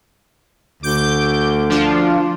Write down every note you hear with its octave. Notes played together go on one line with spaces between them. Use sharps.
D2 D6 G6
F3 D4 F4